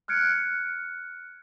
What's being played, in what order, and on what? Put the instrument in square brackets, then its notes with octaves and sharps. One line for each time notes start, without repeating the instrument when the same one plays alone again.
[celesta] F6 F#6 G#6 C#7 D7